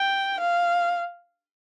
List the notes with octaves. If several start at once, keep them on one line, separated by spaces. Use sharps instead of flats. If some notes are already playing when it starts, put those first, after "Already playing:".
Already playing: G5
F5